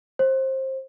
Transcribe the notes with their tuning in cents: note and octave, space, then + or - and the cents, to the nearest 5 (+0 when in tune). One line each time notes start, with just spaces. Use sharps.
C5 +25